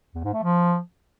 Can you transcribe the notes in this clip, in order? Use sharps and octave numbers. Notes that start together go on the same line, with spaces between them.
E2
G#2
A3
F3